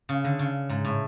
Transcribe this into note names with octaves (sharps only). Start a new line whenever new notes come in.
C#3
D3
C#3
G#2
A2